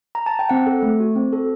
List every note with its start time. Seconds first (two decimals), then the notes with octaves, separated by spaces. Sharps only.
0.15 A#5
0.26 A5
0.39 G5
0.49 C4 F#5
0.67 A4
0.82 A3
1.00 F#4
1.15 C4
1.33 A4